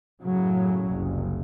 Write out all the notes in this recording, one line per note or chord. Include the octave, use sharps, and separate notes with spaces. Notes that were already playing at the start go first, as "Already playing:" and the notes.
F#2 A2 C#3 F#3
F#1 C2